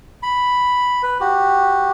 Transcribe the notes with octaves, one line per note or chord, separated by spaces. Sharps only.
B5
B4
F#4 G4